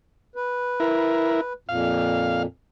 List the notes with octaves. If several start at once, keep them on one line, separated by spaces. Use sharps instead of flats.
B4
E4 A#4
F2 A#2 F5